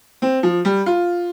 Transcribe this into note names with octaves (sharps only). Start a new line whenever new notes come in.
C4
F3
G3
F4